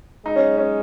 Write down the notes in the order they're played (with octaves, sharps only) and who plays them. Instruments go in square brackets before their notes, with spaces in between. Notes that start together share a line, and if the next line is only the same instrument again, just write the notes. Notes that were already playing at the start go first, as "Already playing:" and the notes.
[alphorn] G#3 [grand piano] D#4
[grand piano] C#4
C#4